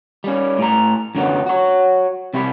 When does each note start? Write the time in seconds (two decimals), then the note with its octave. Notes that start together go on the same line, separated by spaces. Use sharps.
0.24 G3 C#4
0.58 A2 A#5
1.15 F#2 D3 F#3 B3
1.46 F#4 C#5
2.34 C3 G3 E4 G4